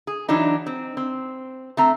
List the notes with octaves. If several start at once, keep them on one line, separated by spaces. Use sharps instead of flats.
G#4
E3 F#3 D4 D#4
C4
C4
A3 C4 A#5